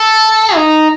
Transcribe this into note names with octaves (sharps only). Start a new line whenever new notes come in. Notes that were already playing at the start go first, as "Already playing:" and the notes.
Already playing: A4
D#4